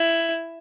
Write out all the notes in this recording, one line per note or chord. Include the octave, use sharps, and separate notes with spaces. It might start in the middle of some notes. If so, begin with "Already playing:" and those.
Already playing: E4